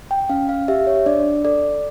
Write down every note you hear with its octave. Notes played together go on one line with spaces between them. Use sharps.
G5
C#4 F5
F5
G4 E5
C#5
D4 D5
A4 D5